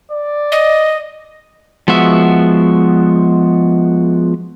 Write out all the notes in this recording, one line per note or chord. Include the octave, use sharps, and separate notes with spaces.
D5
D#5
F3 G#3 B3 F#4 E5